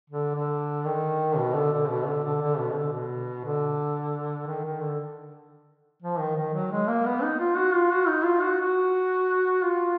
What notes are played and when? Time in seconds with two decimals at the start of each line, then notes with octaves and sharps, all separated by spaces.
0.10 D3
0.35 D3
0.86 D#3
1.37 B2
1.55 D3
1.72 D3
1.90 B2
2.07 D3
2.25 D3
2.41 D3
2.59 B2
2.75 D3
2.93 B2
3.44 D3
4.47 D#3
4.65 D#3
4.81 D3
6.03 F3
6.19 D#3
6.36 D#3
6.54 F#3
6.71 G#3
6.88 A#3
7.05 B3
7.23 D#4
7.40 F4
7.57 F#4
7.74 F4
7.91 F#4
8.08 D#4
8.25 F4
8.43 F#4
8.60 F#4
9.63 F4